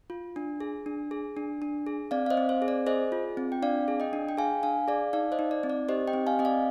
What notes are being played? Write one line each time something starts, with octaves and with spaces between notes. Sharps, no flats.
F4
D4
G#4
D4
G#4
D4
D4
G#4
C4 D5 F5
F5
C5 D#5
C4
C5
G#4
D5
G#4 C5 D#5
F4
C4
G5
D4 D5 F5
G#4
D#5 G5
D4
G5
G#4 F5 G#5
D4 F5 G#5
G#4 D5 F5
D#4 D5 F5
C5 D#5
D#4
D5
C4
D5
G4 C5 D#5
D#5 G5
C4
F5 G#5
C4 D#5
D5 F5